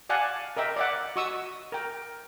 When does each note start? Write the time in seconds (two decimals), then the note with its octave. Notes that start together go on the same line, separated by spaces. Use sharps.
0.09 D5 F5 F#5 G#5 A5
0.57 A#4 D#5 E5 G5
0.76 D5 E5 F#5
1.16 F#4 D#5 C#6 D#6 E6
1.72 A#4 G5